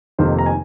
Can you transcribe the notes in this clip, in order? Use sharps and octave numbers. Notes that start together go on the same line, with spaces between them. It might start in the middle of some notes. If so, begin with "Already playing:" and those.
F1 F2 C3 D#3 A#3 C5
A#5
G#5